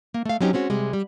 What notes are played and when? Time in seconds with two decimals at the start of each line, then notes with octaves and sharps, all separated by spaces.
0.14 A#3
0.25 A3 F5
0.41 F#3 C4 C#4 D#4 G4
0.53 G#3 C4 C#4 F#4
0.70 C3 G3 G#3
0.93 G3